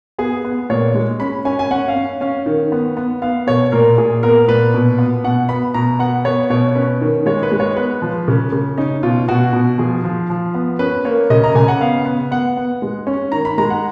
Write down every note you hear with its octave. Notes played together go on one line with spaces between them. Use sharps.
B3 G#4
B3
A#2 C#5
G#3
C#4 B5
C#4 G#5
G#5
C#4 F#5
F5
C#4
C#4 F5
D#3
B3
B3
B3 F5
B2 C#5
A#2 A#4
A#2 G#4
B3 A#4
A#2 B4
B2
B3
B2 F#5
B3 B5
B2 A#5
B3 F#5
B3 C#5
B2 C#5
C#4 B4
D#3
G#3 C#5
B4
G#3
C#5
B3 B4
F3
C#3
C#3
C#4 D#4
B2 F4
B2 F#4
B2
F3 G#4
F3
F3
B3
C#4 B4
A#3 C#5
C#3 D#5
A#5
C#3 G#5
F#5
B3 F5
B3
B3 F#5
B3
G#3
C#4
D#3 A#5
B5
G#3 A#5
F#5